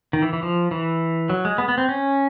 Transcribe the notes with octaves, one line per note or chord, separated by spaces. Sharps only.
D#3
E3
E3
F3
E3
F#3
G#3
B3
B3
C4
C#4